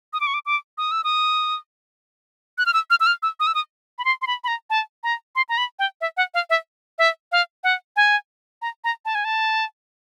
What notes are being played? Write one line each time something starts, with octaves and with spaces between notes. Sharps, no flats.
D#6
D6
C#6
D6
D6
D#6
E6
D#6
F#6
F6
E6
F6
E6
F6
E6
D#6
E6
D#6
B5
C6
C6
B5
B5
A#5
A5
A#5
C6
A#5
B5
G5
E5
F#5
F5
E5
E5
F5
F#5
G#5
A#5
A#5
A5
G#5
A5